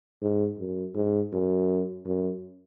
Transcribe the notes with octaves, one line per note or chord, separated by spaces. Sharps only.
G#2
F#2
G#2
F#2
F#2